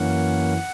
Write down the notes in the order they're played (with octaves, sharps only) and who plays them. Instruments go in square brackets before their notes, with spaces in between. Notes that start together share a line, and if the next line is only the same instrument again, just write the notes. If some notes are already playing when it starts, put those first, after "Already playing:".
Already playing: [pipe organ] F#2 E3 A#3 C#4 F#5